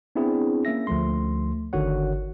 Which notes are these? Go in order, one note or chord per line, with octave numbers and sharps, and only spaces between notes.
B3 C4 D4 E4 G#4
A#3 C#4 E5 A#6
D2 F3 A3 C6
G1 D3 D#3 F#4 C#5 F#5